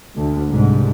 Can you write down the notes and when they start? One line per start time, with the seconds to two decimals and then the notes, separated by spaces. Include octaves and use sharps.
0.16 D2
0.50 C2 G#2 D3